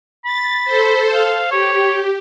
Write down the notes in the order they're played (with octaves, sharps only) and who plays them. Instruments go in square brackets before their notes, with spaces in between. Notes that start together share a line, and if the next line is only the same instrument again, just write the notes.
[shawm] B5 [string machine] A6
[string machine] A4 C5
[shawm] F5
[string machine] G4 [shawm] C#5